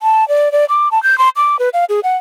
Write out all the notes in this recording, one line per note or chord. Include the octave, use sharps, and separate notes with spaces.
A5
D5
D5
D6
A5
G6
C6
D6
B4
F5
G#4
F#5